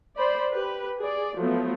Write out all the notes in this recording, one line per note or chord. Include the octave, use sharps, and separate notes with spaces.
C5 D5 B5
G4 B4
G#4 D5
F3 F#3 A3 B3